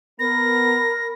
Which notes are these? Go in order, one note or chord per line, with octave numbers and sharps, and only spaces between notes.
B3 A#4 B5 A#6